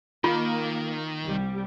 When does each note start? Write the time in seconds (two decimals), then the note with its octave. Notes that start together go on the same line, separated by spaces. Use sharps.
0.24 D#3 A#3 F4
1.24 C2 G3